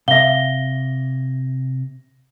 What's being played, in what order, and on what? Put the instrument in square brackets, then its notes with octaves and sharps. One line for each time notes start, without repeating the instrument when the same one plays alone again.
[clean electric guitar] C3 [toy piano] E5 F5 [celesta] A#6 G7